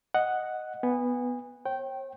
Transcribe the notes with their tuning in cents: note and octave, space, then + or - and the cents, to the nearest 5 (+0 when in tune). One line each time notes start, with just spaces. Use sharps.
D#5 +0 F#5 +0
B3 +0 G#5 -30
C#5 -45 G5 -15